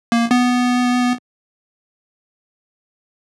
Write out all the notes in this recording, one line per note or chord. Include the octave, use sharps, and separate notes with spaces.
A#3
B3